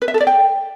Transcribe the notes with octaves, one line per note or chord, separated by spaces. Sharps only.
B4
E5
A4
D5
G5